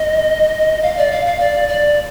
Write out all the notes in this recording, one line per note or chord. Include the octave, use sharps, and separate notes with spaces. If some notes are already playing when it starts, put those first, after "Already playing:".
Already playing: D#5
F5
D5
F5
F5
D5
D5